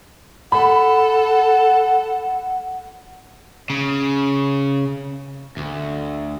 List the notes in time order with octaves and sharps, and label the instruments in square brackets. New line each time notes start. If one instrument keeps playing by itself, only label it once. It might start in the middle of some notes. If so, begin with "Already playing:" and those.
[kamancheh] A4 [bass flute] F#5 [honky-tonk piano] B5
[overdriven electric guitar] C#3
D2